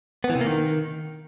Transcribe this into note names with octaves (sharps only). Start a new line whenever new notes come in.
B3
E3
C3
A#3
D#3